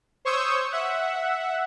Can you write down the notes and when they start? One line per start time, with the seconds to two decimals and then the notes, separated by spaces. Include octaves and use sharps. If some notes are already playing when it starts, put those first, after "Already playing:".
0.25 C5 C#5 C#6 D#6 E6 G6
0.72 E5 F#5